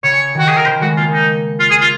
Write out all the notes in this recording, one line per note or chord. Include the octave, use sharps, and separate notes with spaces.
C#3 C#5
D#3 F#4
G#4
A#4
C#3 C5
G#3 F#4
A#3 F4
D#4
F4
G#4
F4